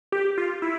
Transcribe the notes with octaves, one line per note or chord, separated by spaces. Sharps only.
G4
F4
E4